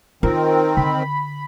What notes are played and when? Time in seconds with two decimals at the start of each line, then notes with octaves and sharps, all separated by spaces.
0.23 D#3 C4 F4 A#4
0.77 D3 B5